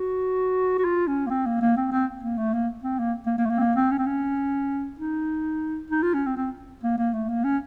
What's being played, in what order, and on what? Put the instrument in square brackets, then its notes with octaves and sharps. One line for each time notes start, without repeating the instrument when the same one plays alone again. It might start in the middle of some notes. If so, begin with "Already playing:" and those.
Already playing: [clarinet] F#4
F#4
F4
C#4
A#3
C4
A#3
A#3
C4
C4
A#3
A3
A#3
C4
A#3
A#3
A#3
A3
A#3
C4
A#3
C4
C#4
C4
C#4
D#4
D#4
F4
C#4
C4
C4
A#3
A#3
A3
A#3
C#4